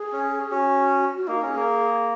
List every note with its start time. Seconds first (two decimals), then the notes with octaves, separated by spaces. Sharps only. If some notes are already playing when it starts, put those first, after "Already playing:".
Already playing: G#4
0.12 C#4
0.39 G#4
0.51 C#4 F#4
1.17 F#4
1.27 A#3 D#4
1.42 C#4
1.47 G#4
1.56 A#3